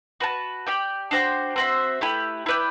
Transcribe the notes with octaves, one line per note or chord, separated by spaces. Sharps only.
F#4 B4 E5 A5
G4 D5 G5
D4 F#4 C5 G5
C4 F#4 C5 E5
A3 E4 G4 B4
E4 B4 D5 G5